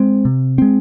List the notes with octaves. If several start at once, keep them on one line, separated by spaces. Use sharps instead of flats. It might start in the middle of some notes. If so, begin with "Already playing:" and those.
Already playing: G#3 C4
C3
G#3 C4